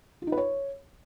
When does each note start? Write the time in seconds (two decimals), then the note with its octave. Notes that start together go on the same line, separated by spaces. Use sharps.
0.22 F4
0.27 D#4
0.32 B4
0.38 C#5